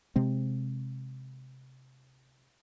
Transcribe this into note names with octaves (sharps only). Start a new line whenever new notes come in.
C3 G#3 C4